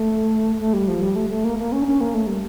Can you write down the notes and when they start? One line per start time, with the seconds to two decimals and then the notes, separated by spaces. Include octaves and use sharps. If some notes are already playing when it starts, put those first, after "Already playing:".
Already playing: A3
0.60 A3
0.73 G3
0.88 F3
1.02 G3
1.16 A3
1.30 A3
1.44 A#3
1.59 A#3
1.72 C#4
1.82 D4
1.86 C#4
2.01 A#3
2.14 A3
2.27 G3